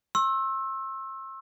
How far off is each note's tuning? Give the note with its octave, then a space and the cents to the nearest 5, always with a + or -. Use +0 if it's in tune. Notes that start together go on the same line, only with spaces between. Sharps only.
C6 +40 E6 +0